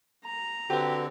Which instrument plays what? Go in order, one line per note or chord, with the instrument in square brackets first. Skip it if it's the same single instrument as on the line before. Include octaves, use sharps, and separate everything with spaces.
[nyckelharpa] A#5
[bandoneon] D3 C4 [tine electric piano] F#4 B4 [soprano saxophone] G4